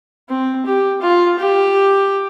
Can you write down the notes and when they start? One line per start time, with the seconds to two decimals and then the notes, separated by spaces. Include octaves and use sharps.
0.29 C4
0.66 G4
1.01 F4
1.38 G4